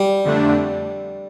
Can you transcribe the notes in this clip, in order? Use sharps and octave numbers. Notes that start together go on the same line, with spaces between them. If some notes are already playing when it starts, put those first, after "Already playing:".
Already playing: G3
F2 D3 A3 D4